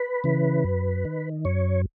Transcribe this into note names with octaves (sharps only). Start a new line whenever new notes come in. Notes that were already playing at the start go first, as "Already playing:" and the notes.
Already playing: B4
C#3 E3
F#2
D#3
F#2 C#5